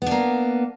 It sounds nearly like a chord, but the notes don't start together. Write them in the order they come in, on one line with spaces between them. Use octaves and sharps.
B3 D4 A#3